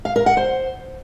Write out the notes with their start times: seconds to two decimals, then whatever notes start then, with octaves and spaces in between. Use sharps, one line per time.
0.05 F5
0.16 A#4
0.26 F#5
0.37 C5